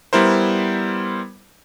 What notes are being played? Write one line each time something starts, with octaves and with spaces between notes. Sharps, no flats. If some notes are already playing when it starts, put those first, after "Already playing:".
G3 B3 E4 A#4 C5